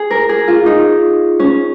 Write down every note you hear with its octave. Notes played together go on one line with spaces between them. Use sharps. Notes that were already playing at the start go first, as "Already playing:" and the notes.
Already playing: G#4
A#4
G#4
F4
D#4
C#4